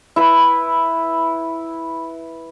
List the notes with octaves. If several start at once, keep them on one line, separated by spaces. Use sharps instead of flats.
E4 B4 B5